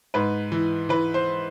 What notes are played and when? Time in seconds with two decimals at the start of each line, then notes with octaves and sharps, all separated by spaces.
0.14 G#2 B4
0.52 E3
0.89 E3 B4
1.14 C5